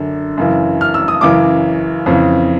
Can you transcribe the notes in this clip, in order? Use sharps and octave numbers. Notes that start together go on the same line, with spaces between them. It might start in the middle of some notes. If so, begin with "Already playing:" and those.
Already playing: F#2 D3
F#2 C#3 E3
F6
E6
D#6
F#2 C#3 E3 D6
F2 C#3 E3